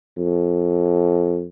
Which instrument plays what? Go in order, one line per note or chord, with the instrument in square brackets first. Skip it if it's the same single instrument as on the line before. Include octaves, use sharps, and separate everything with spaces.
[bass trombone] F2